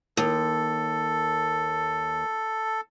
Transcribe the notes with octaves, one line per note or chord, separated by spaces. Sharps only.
D#2 A4